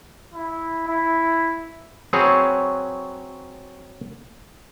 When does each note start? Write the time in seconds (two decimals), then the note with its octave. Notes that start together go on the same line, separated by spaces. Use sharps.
0.34 E4
0.88 E4
2.13 F#3 C4 G#4 B4 C#5